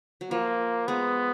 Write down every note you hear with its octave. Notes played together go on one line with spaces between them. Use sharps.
F#3
F3 A#3
G#3 B3